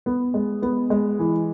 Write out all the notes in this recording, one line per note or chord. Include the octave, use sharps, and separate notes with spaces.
B3
G#3
B3
G#3
E3